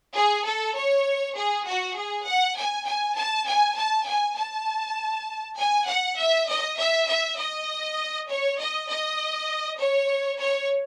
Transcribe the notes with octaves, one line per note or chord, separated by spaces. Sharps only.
G#4
A4
C#5
G#4
F#4
G#4
F#5
G#5
G#5
A5
G#5
A5
G#5
A5
G#5
F#5
E5
D#5
E5
E5
D#5
C#5
D#5
D#5
C#5
C#5